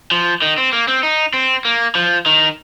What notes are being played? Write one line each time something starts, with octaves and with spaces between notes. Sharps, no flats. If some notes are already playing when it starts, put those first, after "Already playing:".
F3
D#3
C4
A#3
C4
D#4
C4
A#3
F3
D#3